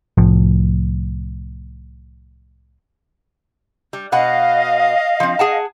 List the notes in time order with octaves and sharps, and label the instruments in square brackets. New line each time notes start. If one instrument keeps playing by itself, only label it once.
[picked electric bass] C2 A2 F3
[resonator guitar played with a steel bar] G3
[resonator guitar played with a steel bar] B2 B3 F#5 [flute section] D#5 F5
[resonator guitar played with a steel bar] F3 C4
G#4 F#5 A5